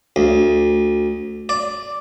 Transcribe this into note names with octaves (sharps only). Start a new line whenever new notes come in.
D2
D5